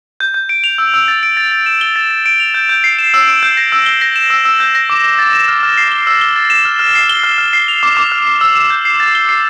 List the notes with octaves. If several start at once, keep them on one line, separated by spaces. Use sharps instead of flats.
G6
G6
D7
F7
E6
E6
A6
D7
A6
A6
E7
G7
A6
A6
D7
F7
G6
G6
C7
E7
E6
D7
G6
A#6
E6
G7
A#6
E7
E6
E6
G6
A#6
D6
G7
A6
E7
F6
F6
C7
G7
E6
G7
A6
E7
F6
F6
C7
G7
F6
F6
C7
F7
D6
D6
F6
C7
E6
E7
G6
C7
A6
G7
C7